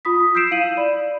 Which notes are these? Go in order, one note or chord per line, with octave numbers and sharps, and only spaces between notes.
F4 B5 D#6 B6
E6 G6 B6 C7 D7 E7
E4 F5 D#7 F#7
D5 B5